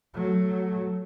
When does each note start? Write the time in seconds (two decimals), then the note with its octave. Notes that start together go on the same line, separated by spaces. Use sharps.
0.14 F#3 A3